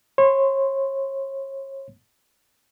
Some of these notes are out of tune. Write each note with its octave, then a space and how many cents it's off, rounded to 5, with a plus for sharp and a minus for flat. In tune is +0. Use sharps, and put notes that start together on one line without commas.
C#5 -35 C6 -30